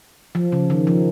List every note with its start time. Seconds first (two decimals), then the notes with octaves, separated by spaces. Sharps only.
0.35 F3
0.52 C#3
0.70 D#3
0.87 F3